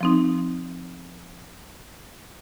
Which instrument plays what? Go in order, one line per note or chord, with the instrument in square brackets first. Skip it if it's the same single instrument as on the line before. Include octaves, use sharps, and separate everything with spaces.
[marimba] F3 C4 D#4